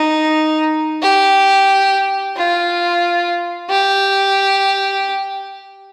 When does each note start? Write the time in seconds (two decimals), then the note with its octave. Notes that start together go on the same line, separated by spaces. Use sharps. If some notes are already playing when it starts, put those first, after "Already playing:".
Already playing: D#4
1.02 G4
2.36 F4
3.70 G4